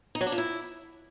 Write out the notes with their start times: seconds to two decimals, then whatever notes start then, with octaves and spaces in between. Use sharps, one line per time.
0.15 D#4
0.21 F#3
0.26 D4
0.32 F3
0.38 E4